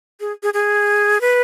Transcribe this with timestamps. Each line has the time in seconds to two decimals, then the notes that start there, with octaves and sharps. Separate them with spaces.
0.20 G#4
0.43 G#4
0.54 G#4
1.21 B4